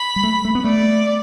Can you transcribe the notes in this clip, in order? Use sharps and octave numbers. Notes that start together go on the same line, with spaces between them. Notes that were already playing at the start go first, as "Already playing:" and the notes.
Already playing: B5
G3
A3
A3
B3
A3 D5